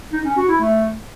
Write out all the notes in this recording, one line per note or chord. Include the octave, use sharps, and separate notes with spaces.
D#4
C#4
F#4
E4
A3